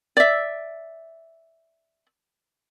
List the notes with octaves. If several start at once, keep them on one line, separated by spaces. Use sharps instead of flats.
D5 E5